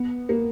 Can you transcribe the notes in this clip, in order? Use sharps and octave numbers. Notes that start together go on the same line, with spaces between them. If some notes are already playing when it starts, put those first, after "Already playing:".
Already playing: B3
A#3